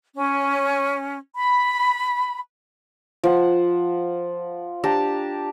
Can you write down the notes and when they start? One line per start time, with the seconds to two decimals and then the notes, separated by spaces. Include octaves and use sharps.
0.16 C#4
1.35 B5
3.23 F3 F#5
4.83 D4 G4 A5 A#5